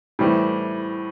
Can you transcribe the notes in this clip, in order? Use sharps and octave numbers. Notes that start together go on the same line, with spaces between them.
A2 E3 G3 C4